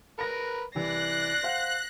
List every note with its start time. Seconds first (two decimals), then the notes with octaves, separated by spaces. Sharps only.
0.19 A#4 B4 B5 A#6
0.75 C2 E3 D5 F#6 A#6 C7
1.43 C5 F5 F#5